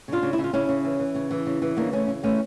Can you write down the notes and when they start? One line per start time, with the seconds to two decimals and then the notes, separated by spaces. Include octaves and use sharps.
0.08 C#3 D4 F4
0.23 C#3
0.33 E4
0.38 C#3
0.44 F4
0.53 C#3 C#4 E4
0.69 C#3
0.85 E3
0.99 E3
1.15 C#3
1.31 E3
1.46 C#3
1.62 E3
1.77 C#3 A#3 D4
1.93 E3 A3 C#4
2.08 C#3
2.23 E3 A3 C#4